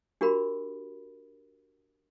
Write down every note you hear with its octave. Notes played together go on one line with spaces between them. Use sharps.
D4 F#4 G4 A#4 B5